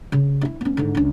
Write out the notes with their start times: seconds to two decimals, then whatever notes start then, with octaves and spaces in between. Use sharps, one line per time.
0.12 C#3
0.41 G2 E4
0.61 B3 C#4
0.77 G#2 D3
0.95 C#2 D4